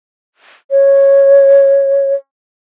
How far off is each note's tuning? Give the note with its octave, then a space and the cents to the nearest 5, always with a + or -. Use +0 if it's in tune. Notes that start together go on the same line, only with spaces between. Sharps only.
C#5 -10